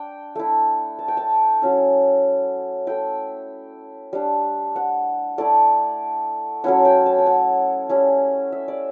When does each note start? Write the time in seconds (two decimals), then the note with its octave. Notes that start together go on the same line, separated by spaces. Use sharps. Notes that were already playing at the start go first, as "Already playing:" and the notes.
Already playing: D4 G5
0.35 A3 E4
0.99 A5
1.08 G5
1.17 A5
1.62 F#3 C#4 E4
2.87 A3 E4 G5
4.13 G3 D4
4.76 F#5
5.38 A3 E4 D5
6.64 F#3 A3 C#4 E4 F#5
6.85 G5
7.06 A5
7.18 G5
7.26 F#5
7.89 G3 C#4 E4
8.52 E5
8.68 D5